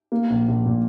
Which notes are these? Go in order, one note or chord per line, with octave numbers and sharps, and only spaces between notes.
A#3
A#1
A#1
A#2